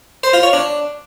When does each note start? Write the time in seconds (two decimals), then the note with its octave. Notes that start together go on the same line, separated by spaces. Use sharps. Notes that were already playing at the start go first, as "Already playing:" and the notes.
0.23 C5
0.33 F4
0.43 C#5
0.53 D4